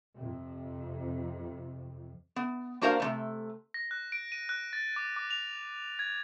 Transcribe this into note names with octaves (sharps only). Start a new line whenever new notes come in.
F2 C3
B3
A#3 D4 F#4 A#4 C5 F5
C3 D#3 A3
A#6
F#6
D7
D#7
F#6
A6
D6
D6
F7
G#6